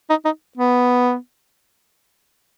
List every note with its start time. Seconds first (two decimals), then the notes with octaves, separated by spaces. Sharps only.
0.10 D#4
0.25 D#4
0.58 B3